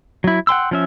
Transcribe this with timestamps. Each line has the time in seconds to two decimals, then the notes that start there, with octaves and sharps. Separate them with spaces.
0.24 F#3 E4
0.47 F#5 G5 C6 E6
0.71 F3 C#4 E5